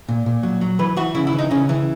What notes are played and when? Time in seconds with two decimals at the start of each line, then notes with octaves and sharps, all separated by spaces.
0.09 A#2
0.26 A#2
0.43 F#3
0.61 F#3
0.79 E3 B4
0.97 E3 F#4
1.14 C#3 E4
1.27 E4
1.33 E3
1.39 D#4
1.51 C#3 C#4
1.69 E3